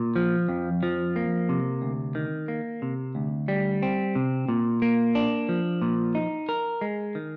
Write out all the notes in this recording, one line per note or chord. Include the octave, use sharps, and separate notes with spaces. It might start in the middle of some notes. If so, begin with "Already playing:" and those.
Already playing: A#2
F3
F2
F3
A#3
C3
D2
D#3
A#3
C3
D2
G3
C4
C3
A#2
A#3
D4
F3
A#2
D#4
A#4
G#3
D#3